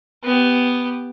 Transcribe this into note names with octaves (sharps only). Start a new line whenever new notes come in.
B3 G4